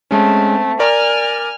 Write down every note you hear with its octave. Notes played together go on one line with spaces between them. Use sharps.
G#3 A3 C4 C#4
A#4 D5 G#5 A#5 F6